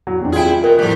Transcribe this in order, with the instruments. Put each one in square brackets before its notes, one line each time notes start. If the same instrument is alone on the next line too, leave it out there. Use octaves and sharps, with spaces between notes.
[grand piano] F#3
E2 C4 D4
[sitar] E4 G#4 [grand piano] F4 G5
[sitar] B2 [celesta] A#4
[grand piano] A2 A#3 [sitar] F3 G3